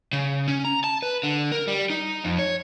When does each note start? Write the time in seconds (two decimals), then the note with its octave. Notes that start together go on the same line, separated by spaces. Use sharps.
0.13 C#3
0.48 C#4
0.65 A#5
0.84 A5
1.02 B4
1.23 D3
1.52 A#4
1.68 G3
1.90 D#4
2.24 F2
2.39 C#5